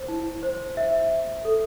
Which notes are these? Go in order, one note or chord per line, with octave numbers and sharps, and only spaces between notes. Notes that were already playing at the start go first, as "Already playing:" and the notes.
Already playing: C5
E4
C5
E5
E5
A4